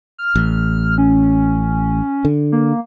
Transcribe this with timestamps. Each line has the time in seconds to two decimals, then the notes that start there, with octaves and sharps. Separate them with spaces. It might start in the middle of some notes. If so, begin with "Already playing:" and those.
0.18 F6
0.35 A1
0.98 C#4
2.25 D3
2.52 A#3